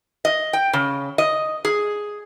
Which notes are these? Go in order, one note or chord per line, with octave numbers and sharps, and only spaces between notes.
D#5
G5
C#3
D#5
G#4